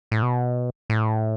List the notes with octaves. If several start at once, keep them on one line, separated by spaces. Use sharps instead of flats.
A2
B2
A2